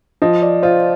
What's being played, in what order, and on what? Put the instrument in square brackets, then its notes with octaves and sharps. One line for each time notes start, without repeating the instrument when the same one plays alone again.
[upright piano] F3 [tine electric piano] D#5
[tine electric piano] D5
[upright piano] F4 [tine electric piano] C5